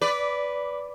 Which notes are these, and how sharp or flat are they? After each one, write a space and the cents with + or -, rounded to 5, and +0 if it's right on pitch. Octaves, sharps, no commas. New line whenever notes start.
B4 +0 D5 -15